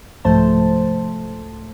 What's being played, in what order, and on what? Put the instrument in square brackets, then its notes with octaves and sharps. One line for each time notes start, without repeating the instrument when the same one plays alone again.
[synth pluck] C2 G#2 F3 A3 C5 A5